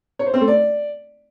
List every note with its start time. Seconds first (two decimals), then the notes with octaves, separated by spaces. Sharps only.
0.19 C#5
0.26 C5
0.34 C4
0.41 A3
0.48 D5